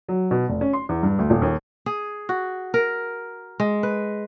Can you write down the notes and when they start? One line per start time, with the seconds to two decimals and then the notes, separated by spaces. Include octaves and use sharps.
0.08 F#3
0.31 B2
0.49 F1
0.61 C#4
0.73 C6
0.89 E2
1.03 G2
1.19 D2
1.30 D#1
1.42 D#2
1.86 G#4
2.29 F#4
2.74 A#4
3.60 G#3
3.83 B4